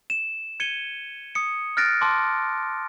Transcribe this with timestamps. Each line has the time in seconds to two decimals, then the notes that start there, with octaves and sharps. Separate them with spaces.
0.10 E7
0.60 G#6 C#7 D#7 G7
1.35 D#6 C#7
1.77 F6 F#6 A6 A#6 D7
2.01 A5 C6 D6